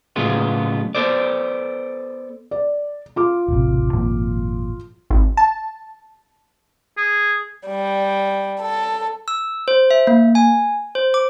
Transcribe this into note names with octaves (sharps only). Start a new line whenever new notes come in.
A2 C#3 F#3 G#3 B3 F4
B3 A4 C5 D5
D5
F4 D6
E1 A1 C3
G#1 F2 A#2
G#1
A5
G#4
G3
A4
E6
C5
E5
A#3
G#5
C5
D6